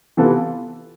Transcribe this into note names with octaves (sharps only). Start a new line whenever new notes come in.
C3 E3 B3 F4 A4